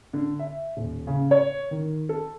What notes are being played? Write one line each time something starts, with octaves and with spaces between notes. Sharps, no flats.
D3
E5
D#1
C#3
C#5
D#3
A4